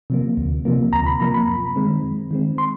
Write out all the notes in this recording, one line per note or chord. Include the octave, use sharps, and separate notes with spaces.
C3 F3 A#3
D2
C3 F3 A#3
D2 A#5
B5
C3 F3 A#3 A#5
B5
F#2
D#3 G#3 C4
F#2
D#3 G#3 C4
C6